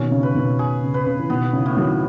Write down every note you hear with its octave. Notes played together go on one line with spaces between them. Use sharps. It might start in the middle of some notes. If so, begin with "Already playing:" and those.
Already playing: B2 D#3 C#4
C#3
B4
B2 D#3
G#4
C#3
B4
C#3
E3
B2 D#3 B3
C#3 E3
A2
D#3 F#3